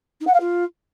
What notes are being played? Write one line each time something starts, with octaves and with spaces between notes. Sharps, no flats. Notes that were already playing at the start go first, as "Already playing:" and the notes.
D#4
F#5
F5
F4